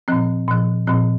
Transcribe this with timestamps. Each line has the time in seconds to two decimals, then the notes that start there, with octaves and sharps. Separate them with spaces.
0.08 A#2 F3 C4
0.48 A#2 F3
0.87 A#2 F3 C4